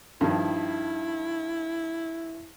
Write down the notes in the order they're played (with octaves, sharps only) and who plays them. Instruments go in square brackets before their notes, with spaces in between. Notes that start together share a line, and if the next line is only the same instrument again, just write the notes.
[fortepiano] G2 D#3 F3 [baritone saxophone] E4